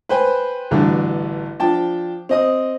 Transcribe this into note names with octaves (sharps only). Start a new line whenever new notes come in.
B4 C5 G5 G#5
A1 G2 D3 E3 D4 F#4
F3 D4 G5 A5
C4 D#5 D#6